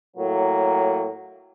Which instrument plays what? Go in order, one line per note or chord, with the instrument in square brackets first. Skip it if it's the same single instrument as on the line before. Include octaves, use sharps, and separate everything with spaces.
[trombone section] A2 F#3 A#3